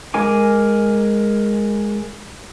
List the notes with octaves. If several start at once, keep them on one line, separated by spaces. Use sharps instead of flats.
G#3 A#4 G#5 D6